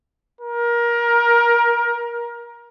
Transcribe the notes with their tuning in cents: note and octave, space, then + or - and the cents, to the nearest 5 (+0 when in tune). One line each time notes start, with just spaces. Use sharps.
A#4 +25